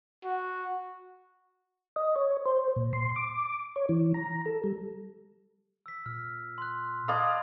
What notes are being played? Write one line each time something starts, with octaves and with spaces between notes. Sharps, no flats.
F#4
D#5
C#5
C5
A#2
C6
D6
C#5
E3
A#5
A4
G3
E6 B6
A#2 F6
C6 F#6
D5 D#5 F5 A5 B5 G#6